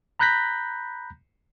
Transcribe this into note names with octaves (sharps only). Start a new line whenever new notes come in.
A#5 B5 F#6 G6 A#6 B6